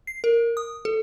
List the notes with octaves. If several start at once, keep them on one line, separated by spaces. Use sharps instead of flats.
C7
A#4
D#6
A4